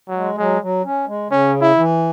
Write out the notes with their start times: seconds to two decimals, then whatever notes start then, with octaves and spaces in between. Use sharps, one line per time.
0.08 F#3
0.15 G#3
0.38 F#3 G#3
0.61 F#3
0.85 C#4
1.07 G#3
1.30 C#3 C#4
1.61 E4
1.77 E3